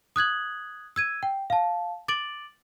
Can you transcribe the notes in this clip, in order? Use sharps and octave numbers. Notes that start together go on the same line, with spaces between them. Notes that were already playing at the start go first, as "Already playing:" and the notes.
D#6 F#6 G#6 F#7
E6 G#6 D#7
G5
F5 A5
D6 A6 D7 F#7